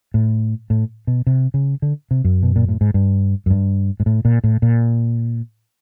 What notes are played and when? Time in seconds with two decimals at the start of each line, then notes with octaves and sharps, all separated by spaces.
0.14 A2
0.70 A2
1.07 B2
1.27 C3
1.54 C#3
1.82 D3
2.11 C3
2.24 F#2
2.43 B2
2.56 A#2
2.68 A2
2.81 G#2
2.94 G2
3.46 F#2
3.50 G2
4.00 G#2
4.06 A2
4.25 A#2
4.44 A2
4.62 A#2